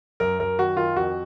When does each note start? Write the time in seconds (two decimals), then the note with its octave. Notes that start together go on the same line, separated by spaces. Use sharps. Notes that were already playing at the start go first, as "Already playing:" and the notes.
0.20 F#2 A#4
0.40 F#2 A#4
0.59 D#3 F#4
0.77 D#3 F4
0.96 F2 F#4